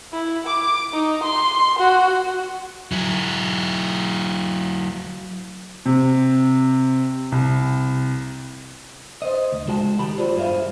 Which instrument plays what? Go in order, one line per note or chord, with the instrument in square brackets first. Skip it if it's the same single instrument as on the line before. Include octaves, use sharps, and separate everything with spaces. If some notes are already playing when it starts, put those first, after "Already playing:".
[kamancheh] E4
D6
D#4
C6
F#4
[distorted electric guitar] F#3 E4
[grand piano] C3
C2
[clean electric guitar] C5 D#5
D2
C#2 G#3 F#4 G#5 A5
D#3 G4 B5
F4 F#4 G#4 C5 D5
G2 G#4 C5 E5 F5